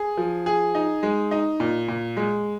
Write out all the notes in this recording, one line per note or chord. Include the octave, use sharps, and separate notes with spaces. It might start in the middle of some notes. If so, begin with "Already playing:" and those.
Already playing: G#4
F3
G#4
D#4
G#3
D#4
A#2
A#2
G#3